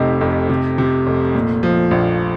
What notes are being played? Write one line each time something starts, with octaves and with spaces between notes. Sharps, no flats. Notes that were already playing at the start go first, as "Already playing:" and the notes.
Already playing: F1 C3 D#4 G4
F2
C3
C3
F1
A#2
F3
A#1